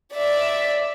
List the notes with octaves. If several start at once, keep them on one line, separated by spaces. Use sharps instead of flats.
D5 E5